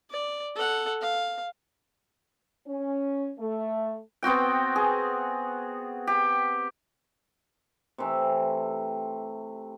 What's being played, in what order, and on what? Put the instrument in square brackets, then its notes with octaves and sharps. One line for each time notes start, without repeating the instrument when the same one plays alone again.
[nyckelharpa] D5
A4 F#5
F5
[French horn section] C#4
A3
[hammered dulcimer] B3 C4 F#4 G5
G#4
G4
C3 E3 A3